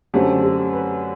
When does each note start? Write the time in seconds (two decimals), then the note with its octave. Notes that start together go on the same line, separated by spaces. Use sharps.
0.14 F#2 D3 A3 C4 G4
0.43 G4
0.73 B4